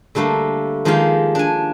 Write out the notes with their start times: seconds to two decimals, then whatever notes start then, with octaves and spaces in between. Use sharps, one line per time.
0.15 D3 G3 A3 A#3
0.85 D#3 F3 G#3 A#3 G4 F5
1.35 D4 G#5